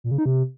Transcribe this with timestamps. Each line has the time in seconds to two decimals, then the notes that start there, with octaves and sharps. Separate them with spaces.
0.04 A#2
0.11 C#3
0.18 D#4
0.26 C3